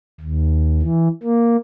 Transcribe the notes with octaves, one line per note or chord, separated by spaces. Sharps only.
D#2
E3
A#3